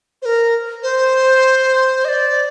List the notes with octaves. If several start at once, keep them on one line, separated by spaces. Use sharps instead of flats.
C5
A#4
C5
D#5
D5